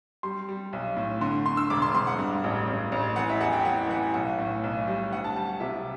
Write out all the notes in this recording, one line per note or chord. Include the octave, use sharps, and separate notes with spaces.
G3 C6
G3
B1
A2
D3 C6
D3 C6
E6
E1 D6
C6
E1 C6
F#5
G2
A1
A1
A1
E3 F#5
E5
E2 F#5
G5
E3 F#5
E3 F#5
B1 F#5
A2
B1
G3
D2 F#5
A5
G3 A5
F#5
C3 E5